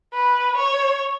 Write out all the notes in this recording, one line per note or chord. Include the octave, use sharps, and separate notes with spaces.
B4
C#5